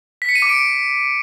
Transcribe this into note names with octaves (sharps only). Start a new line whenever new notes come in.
B6
C#7
D#7
D6
D7